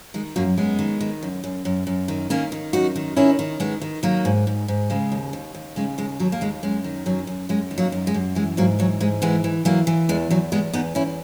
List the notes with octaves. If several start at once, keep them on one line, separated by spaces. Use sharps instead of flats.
D#3 G#3
F#2 F#3 A#3
F#2 G#3 B3
D#3
D#3
F#2
F#2
F#2
F#2
D#3
D#3 A#3 C#4
D#3
F#2 D#4 F#4
D#3
D#3 C#4 E4
D#3
D#3 G#3 B3
D#3
D#3 F#3 A#3
G#2
G#2
G#2
C#3 G#3
D#2
D#2
D#2
C#3 G#3
D#2 G#3
D#2 F#3
A#3
D#2 G#3
F#2 G#3
D#3
F#2 F#3
F#2
F#2 G#3
D#3
F#3 A#3
F#2
G#3
F#2
E3 G#3
G#2 F#3 A#3
E3 F#3
G#2 G#3
E3 G#3 B3
E3
E3 F#3 A#3
E3
E2 G#3
E2 F#3
E2 G#3 B3
E2 B3 D#4
E2 C#4 E4